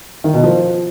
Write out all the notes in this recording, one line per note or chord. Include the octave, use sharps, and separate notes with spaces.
D#3
B2
F3